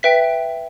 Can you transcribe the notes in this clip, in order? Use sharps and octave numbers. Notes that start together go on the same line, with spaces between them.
B4 E5 G5 B6